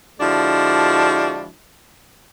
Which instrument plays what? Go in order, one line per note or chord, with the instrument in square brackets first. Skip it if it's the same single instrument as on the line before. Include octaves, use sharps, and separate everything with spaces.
[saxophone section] D3 F3 G#3 D4 E4 F#4